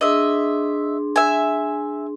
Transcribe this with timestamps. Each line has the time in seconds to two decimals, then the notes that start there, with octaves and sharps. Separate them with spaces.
0.01 D4 G#4 D#5 E5 C6
1.16 E5 G#5